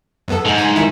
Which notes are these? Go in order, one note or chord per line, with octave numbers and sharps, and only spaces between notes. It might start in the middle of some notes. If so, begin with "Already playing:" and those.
F#2 B3 A4
G#2
G#5
D#3 E4